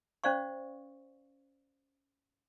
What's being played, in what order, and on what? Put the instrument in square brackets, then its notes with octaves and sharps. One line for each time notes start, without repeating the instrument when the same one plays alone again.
[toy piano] C#4 C5 D5 F5 C#6